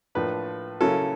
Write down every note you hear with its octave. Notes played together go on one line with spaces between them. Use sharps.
A2 F3 A#3 D4 B4
C#3 F#3 A#3 C#4 E4 A4